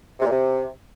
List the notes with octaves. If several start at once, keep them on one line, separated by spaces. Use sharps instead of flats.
C3
A#2
C3